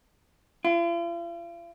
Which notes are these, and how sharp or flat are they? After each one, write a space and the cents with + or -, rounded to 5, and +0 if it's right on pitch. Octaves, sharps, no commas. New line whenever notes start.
F4 -45